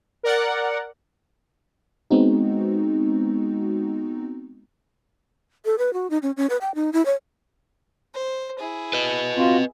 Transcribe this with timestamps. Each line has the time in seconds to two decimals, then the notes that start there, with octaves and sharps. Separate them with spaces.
0.23 A#4 D5 F#5
2.10 G#3 B3 C4 D#4 F#4
5.65 A4
5.78 B4
5.93 F#4
6.10 D#4
6.22 C#4
6.37 C#4
6.50 B4
6.61 G5
6.75 D#4
6.93 E4
7.06 C#5
8.14 C5
8.59 E4 G#4
8.93 B4 D#5
9.36 C4 F4 F#4